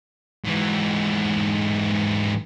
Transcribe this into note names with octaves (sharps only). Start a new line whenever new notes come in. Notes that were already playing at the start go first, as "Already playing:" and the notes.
G#2 E3